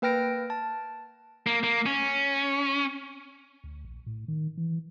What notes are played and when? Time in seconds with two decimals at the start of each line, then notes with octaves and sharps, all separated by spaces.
0.02 A#3 B4 G5 F6 A#6 D7
0.50 A5
1.47 A#3
1.63 A#3
1.86 C#4
3.64 D2
3.84 A#1
4.06 A2
4.28 D#3
4.57 E3